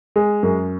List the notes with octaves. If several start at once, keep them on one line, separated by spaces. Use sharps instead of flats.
G#3
F#2